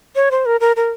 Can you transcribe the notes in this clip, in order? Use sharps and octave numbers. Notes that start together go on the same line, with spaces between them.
C#5
C5
A#4
A#4
A#4